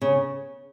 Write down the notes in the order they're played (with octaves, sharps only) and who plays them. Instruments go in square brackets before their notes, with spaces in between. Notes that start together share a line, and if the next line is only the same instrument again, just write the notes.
[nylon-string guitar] C#3